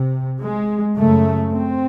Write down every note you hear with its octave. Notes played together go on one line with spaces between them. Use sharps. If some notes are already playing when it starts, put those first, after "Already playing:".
Already playing: C3
G#3
F#2 C#3 A3
C4